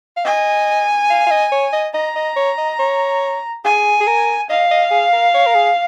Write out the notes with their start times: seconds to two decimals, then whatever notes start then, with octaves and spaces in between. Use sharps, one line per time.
0.16 F5
0.25 D#5 G#5
1.10 F5
1.27 F5
1.31 D#5
1.52 C#5
1.73 D#5
1.94 D#5 A#5
2.16 D#5
2.36 C#5
2.58 D#5
2.79 C#5
3.65 G#4 G#5
4.01 G#4
4.07 A#4
4.49 D#5 F5
4.71 D#5
4.91 G#4
5.13 A#4
5.34 C#5
5.46 A#4
5.55 G#4